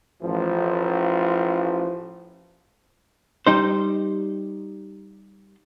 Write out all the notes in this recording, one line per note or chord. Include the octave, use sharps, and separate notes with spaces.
A1 F3
G3 D#4 C5